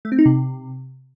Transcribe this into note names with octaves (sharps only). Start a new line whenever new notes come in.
A3
C4
D#4
C3